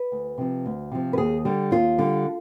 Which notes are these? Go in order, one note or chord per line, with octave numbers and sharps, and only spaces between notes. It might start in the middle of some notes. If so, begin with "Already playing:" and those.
Already playing: B4
D2
C3 F3
D2
C3 F3
B4
D#2 G#4
D3 G3
D#2 F4
D3 G3